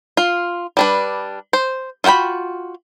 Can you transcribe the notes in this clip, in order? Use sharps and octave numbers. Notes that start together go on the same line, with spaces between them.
F4
G3 D4 B4
C5
F4 F#4 F#5 G5 B5